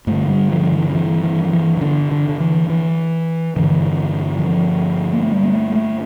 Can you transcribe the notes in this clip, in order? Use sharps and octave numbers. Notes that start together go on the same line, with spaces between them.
G2 D3 A3
G3
F3
E3
D3
E3
E3
F3
E3
E3
D3
D3
D3
E3
E3
G2 D3 E3
E3
F3
A#3
A3
G3
A#3
A3
A3